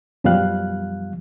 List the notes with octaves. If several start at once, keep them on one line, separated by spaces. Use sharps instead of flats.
F#2 B2 F3 G3 F5 F#6